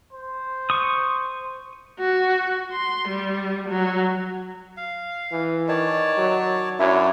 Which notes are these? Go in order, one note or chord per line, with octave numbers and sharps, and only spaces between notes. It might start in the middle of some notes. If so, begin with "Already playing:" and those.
C5
C#6 D#6
F#4
C6
G3
F#3
F5
E3
D#3 C#5 D5 A5
F#3
F#2 D4 E4 C#5